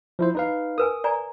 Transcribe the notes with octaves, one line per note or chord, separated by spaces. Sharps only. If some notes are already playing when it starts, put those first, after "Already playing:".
F3 E4 C5
D#4 B4 F5
A#4 B4 G#5 D#6
D5 G#5 A#5